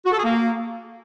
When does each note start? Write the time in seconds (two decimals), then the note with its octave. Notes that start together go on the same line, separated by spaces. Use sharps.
0.06 F#4
0.12 A4
0.18 G#4
0.24 A#3